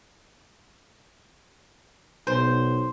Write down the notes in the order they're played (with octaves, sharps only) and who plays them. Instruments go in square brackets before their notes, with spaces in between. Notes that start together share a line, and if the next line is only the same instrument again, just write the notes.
[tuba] B1 [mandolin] C5